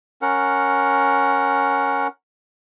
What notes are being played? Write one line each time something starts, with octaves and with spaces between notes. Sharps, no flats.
C#4 A#4 F#5